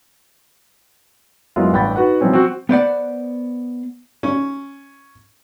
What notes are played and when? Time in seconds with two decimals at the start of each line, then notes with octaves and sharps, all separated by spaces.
1.56 F#2 F#3 G#3 B3 E4 F4
1.72 A1 G2 F#5 G5 B5 A6
1.96 D#4 F#4 B4 F#5
2.21 B2 E3 F3 G3 C4 C#4
2.33 C4 F#4
2.69 B3 C5 D5 F#5
4.23 C#4